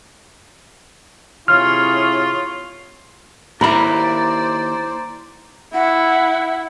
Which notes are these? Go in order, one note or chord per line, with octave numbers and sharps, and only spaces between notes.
C3 E4 F4 G#4 C#5 F6
D#2 E4 A#4 C5 D5 A#5 B5
E4 F#5